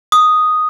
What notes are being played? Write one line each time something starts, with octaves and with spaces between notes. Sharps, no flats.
D#6